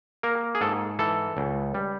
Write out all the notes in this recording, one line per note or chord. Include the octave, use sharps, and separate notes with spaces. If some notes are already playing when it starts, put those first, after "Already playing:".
A#3 A#4
G#4
G#2 A4
E3 A4
C#2
G3